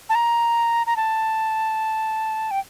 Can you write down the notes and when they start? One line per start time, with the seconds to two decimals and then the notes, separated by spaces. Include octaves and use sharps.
0.09 A5
0.15 A#5
0.87 A#5
0.96 A5
2.51 G5